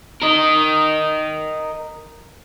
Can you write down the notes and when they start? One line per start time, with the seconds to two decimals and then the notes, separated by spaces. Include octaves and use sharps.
0.22 A#4 D#5